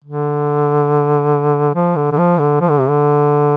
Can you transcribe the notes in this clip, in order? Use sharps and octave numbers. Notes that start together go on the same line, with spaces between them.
D3
F3
D3
D3
F3
D3
F3
D3
C3
D3